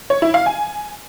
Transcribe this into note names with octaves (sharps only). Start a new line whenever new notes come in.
C#5
E4
F5
G#5